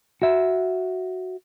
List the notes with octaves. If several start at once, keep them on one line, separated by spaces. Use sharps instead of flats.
F#4 E5